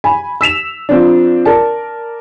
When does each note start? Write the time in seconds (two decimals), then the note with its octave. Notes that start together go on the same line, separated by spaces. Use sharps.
0.04 G#5 B5
0.41 E6 B6 E7 F7
0.89 F3 C4 D4
1.45 A#4 D5 A5